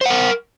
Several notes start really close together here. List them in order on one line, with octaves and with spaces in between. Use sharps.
C5 F#5 A#4